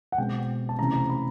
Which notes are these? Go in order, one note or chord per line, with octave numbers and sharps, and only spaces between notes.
F#5
B2 G#3 C4 G5
A5
C3 E3 A3 C#4 A#5
A#5
B5